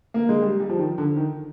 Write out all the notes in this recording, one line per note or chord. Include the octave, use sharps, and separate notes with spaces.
A#3
G#3
G3
G3
F3
D#3
D3
D#3